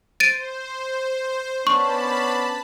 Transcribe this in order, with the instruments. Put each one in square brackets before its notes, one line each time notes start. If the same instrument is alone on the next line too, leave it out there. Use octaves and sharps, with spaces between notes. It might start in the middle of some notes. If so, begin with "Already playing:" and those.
[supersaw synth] C5 [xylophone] A6 D7 D#7
[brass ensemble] B3 C#4 D4 [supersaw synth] A5 B5 [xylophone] C#6